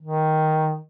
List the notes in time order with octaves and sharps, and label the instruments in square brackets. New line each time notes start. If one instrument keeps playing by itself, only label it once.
[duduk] D#3